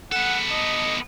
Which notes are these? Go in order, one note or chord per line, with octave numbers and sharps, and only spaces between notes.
B3 A4 F#5
D#5